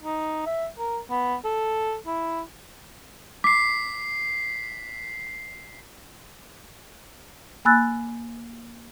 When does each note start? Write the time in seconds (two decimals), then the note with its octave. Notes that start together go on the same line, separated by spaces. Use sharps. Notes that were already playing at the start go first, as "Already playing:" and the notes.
0.04 D#4
0.46 E5
0.79 A#4
1.10 B3
1.45 A4
2.07 E4
3.44 D6 B6 C7
7.65 A#3 G#5 B5 E6 F#6 A6